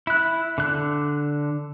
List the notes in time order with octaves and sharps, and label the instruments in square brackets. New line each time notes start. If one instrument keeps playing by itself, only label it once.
[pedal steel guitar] E4 F#6
D3 F#6